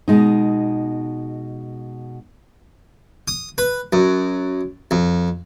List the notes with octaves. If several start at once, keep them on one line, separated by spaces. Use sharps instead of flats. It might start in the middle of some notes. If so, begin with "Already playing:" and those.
B2 G#3 D#4
D#6
B4
F#2
F2